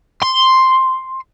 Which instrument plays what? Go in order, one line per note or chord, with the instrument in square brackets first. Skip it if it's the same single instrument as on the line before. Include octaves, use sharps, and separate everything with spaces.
[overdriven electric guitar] C6